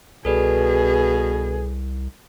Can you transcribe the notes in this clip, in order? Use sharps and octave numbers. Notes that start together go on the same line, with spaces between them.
C2 B2 G#4 A4 B4 D5